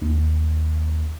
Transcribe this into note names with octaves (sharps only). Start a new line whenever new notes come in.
D#2